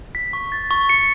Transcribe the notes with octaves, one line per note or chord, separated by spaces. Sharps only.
B6
C#6
A6
C#6
C#7